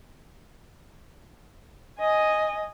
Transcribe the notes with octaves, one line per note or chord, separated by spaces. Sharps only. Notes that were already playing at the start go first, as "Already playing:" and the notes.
D#5 G#5